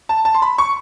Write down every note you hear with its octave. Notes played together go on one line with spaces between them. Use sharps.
A5
A5
C6
B5
C#6